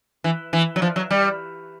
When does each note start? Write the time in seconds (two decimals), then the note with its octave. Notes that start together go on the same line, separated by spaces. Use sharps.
0.24 E3
0.53 E3
0.76 F#3
0.82 F3
0.96 F#3
1.11 G3